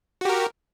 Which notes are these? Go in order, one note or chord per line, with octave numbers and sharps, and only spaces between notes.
F#4 G4 A#4